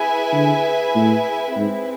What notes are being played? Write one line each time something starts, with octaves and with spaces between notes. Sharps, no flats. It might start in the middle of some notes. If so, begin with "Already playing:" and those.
Already playing: E4 G#4 B4 E5 G#5
D3
A2
G#2 C4 E4 G#4 B4 E5